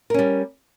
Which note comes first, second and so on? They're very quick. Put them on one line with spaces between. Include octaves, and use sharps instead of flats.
A#4 C#4 G3